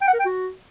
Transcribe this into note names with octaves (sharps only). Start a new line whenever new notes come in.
G5
F#5
A#4
G5
F#4